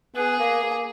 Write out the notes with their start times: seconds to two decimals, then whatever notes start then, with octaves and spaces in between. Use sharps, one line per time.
0.15 B3 G#4
0.39 A#3
0.63 A#3